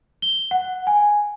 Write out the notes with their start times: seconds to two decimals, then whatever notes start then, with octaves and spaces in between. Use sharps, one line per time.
0.22 G7
0.51 F#5
0.87 G#5